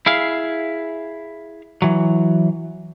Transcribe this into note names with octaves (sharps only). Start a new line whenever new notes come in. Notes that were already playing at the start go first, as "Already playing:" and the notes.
E4 G#4 F5
E3 F#3